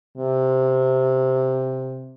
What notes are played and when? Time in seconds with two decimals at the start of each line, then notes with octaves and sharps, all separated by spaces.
0.18 C3